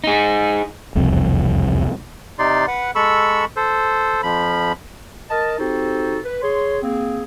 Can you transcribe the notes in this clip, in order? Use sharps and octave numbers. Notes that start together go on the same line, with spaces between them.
D#4 G#4
E1 C2 F2 C4
C3 D#4 D5 C6
B4 F#5
G#3 A4 B5 C#6 E6
A4 C5
F2 F3 B5
A#4 D#5 A5
C4 D#4 F#4 G4 A4 C5
B4
G#4 C#5 C6
A#3 C4 G#4